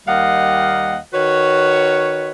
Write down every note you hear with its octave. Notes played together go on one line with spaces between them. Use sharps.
D#2 G3 A#3 D#5 F5 F#5
D#3 F#4 B4 C#5